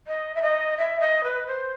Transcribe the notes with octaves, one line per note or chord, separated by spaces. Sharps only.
D#5
E5
D#5
E5
D#5
B4
C5